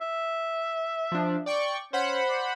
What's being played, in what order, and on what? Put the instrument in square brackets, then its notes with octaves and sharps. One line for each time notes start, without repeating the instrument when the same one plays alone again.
[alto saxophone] E5
[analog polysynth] F3 D4
D5 G5 C#6
[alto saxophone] C#4 [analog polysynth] C5 F#5 B5
[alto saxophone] D5